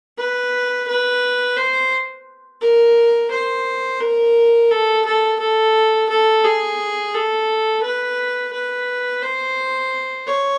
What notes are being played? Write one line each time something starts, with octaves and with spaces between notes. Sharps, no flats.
B4
B4
C5
A#4
C5
A#4
A4
A4
A4
A4
G#4
A4
B4
B4
C5
C#5